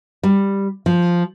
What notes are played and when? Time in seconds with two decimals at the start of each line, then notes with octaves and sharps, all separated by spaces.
0.23 G3
0.86 F3